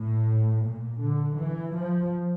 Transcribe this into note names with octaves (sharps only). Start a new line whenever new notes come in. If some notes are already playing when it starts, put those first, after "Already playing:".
Already playing: A2
A#2
D3
E3
F3